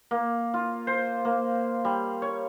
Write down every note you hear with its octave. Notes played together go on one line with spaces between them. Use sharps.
A#3
F4
C5
A#3
G3
C#5